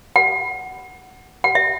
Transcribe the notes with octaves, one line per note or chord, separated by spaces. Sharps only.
F#5
F#5
E5